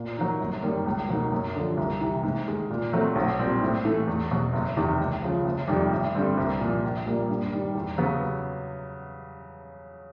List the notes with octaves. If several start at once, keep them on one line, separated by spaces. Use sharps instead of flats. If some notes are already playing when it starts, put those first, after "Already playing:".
Already playing: A#2
F#3 A#3 D#4
G1
F#2 D#3 G3 A#3
C#2
B2 F#3 A#3 D#4
F#2
D3 F3
C2
C3 E3
G#2
D#3 G#3
A#2
F#3 A3 C4
B1
A#2 G3 C4
A2
E3 A3
E2
B2 F#3
F#1
E2 C3 D#3
C#2
C#3 F3
F#1
F2 C3 D#3 G3
A1
G2 D3 G3 C4
C2
A#2 F3
A#1
A#2 G3 A#3
G2
D#3 G3
E2
C#3 F#3 B3